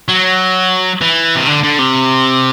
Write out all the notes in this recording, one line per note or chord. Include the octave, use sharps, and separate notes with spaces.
F#3
E3
C3
D3
D3
C3